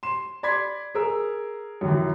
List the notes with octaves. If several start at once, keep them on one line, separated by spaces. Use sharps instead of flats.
C6 E7
D5 B5 C6 G#6 B6
G#4 A#4 E6
F#2 B2 D#3 E3